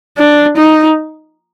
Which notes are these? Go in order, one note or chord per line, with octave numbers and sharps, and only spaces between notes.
D4
D#4